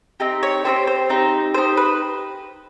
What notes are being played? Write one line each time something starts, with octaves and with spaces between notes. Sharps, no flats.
C4 D#4 G4
C#5
C4 D#4 G4 C5
C5
C4 D#4 G4
C4 D#4 G4 C5
B4